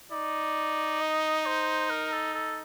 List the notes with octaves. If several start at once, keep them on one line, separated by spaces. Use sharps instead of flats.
D#4 D5
D#5
C5
A#4
A4
A4